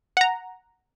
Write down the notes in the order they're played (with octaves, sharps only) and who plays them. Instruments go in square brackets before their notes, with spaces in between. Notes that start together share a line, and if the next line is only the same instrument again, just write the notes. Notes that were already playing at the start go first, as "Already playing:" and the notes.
[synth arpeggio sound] F#5 A#5